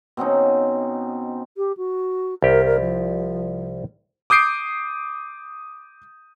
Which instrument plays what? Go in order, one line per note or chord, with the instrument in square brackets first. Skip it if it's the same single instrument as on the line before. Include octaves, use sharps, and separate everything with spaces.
[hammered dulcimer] B2 C4 C#4 D#4
[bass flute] G4
F#4
[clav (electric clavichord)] C2 G4 [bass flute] A#4
[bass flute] A#4
F3
[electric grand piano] D6 D#6 G6 C7 D7